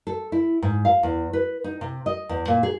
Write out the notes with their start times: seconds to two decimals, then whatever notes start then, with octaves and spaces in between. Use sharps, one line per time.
0.07 A4
0.32 E4
0.62 G#2
0.85 F5
1.03 E2
1.33 B4
1.64 D#4
1.81 C3
2.06 D#5
2.29 E2
2.48 A#2
2.63 G#4